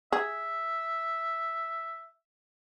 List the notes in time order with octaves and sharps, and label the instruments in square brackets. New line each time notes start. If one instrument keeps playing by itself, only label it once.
[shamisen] G#4 [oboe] E5